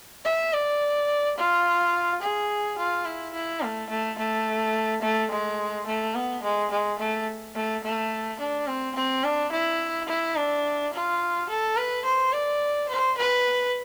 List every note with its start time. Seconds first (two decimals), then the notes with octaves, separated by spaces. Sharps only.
0.25 E5
0.53 D5
1.37 F4
2.22 G#4
2.78 F4
3.05 E4
3.34 E4
3.62 A3
3.90 A3
4.18 A3
5.02 A3
5.31 G#3
5.86 A3
6.15 B3
6.43 G#3
6.71 G#3
6.99 A3
7.55 A3
7.83 A3
8.40 D4
8.67 C4
8.95 C4
9.24 D4
9.52 E4
10.08 E4
10.36 D4
10.93 F4
11.49 A4
11.77 B4
12.05 C5
12.33 D5
12.89 C5
13.18 B4